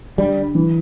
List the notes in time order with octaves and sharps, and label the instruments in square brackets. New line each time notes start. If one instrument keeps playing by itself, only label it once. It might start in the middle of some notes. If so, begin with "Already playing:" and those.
[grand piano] D3 [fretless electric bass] G3
[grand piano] D3
E3